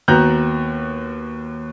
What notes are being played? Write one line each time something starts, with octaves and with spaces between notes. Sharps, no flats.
D#2 B3 F#4 A#5 F#6 G6